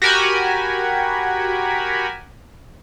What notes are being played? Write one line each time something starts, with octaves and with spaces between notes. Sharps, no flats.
F#4 G4 A#4 G#5 B5